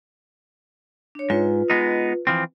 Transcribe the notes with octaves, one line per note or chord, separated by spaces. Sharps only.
D4 C#5
G#2 F4 B4
G#3 B3 D#4
E3 F3 C4